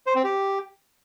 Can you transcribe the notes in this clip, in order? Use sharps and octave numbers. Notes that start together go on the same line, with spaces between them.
C5
C4
G4